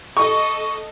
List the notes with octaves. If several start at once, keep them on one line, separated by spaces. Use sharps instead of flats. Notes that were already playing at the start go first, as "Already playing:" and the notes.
A4 D#5 C#6